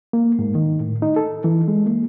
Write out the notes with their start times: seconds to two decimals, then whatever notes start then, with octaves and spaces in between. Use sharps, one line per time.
0.13 A#3
0.39 G#2
0.55 D#3
0.80 A2
1.02 D#4
1.16 A4
1.44 E3
1.68 G#3
1.86 A#3